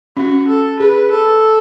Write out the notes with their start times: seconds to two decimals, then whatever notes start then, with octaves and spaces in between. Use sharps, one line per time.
0.17 C#4 F#4
0.48 A4
0.79 G#4 B4
1.11 A4